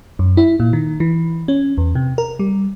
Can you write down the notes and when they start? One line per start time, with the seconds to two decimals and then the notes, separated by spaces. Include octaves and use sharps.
0.19 F#2
0.37 E4
0.60 A#2
0.73 D#3
1.00 E3
1.48 C#4
1.78 E2
1.95 C3
2.18 A#4
2.39 G3